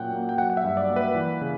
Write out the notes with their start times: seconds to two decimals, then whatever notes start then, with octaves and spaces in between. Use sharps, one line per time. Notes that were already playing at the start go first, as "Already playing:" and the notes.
Already playing: A#2 F#3 C#4 F#5 G5
0.12 A#3
0.29 G5
0.38 F#3 F#5
0.50 F#5
0.57 E5
0.64 G2
0.77 D5
0.90 A#3
0.96 B4
1.15 E3
1.41 C#3